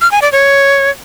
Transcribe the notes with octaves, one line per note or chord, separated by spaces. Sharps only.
F6
G#5
D5
C#5